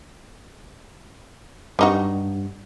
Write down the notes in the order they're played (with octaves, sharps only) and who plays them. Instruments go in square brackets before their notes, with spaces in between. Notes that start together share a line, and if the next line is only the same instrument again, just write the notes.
[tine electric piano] G2 [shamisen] G3 D#4 F#4